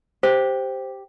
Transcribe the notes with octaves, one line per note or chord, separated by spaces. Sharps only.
G4 C5